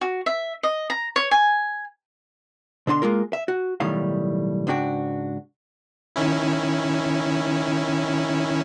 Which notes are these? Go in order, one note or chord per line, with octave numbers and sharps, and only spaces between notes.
F#4
E5
D#5
A#5
C#5
G#5
B2 D3 D4 C6
G#3 A#3 F4 A#4
E5
F#4
B1 A2 D#3 G3 A3 F5
C#2 G#2 D4 F#4 G5
D#3 C#4 E4